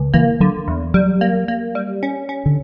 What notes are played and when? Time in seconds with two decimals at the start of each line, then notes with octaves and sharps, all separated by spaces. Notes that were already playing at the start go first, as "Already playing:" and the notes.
Already playing: C#2
0.14 E3 A#3
0.40 D3 F#3
0.68 E2
0.94 F#3 G3
1.21 A#3
1.48 A#3
1.75 G3
2.03 C#4
2.29 C#4
2.46 D3